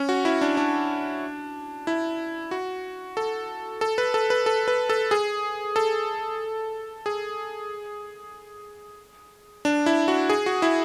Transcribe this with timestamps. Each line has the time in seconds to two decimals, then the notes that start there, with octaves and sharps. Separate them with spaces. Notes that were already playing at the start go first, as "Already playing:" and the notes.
Already playing: C#4
0.09 F#4
0.25 E4
0.41 D4
0.57 D4
1.87 E4
2.51 F#4
3.17 A4
3.81 A4
3.98 B4
4.14 A4
4.30 B4
4.46 A4
4.68 B4
4.90 A4
5.11 G#4
5.76 A4
7.06 G#4
9.65 D4
9.86 E4
10.08 F#4
10.30 G#4
10.46 F#4
10.62 E4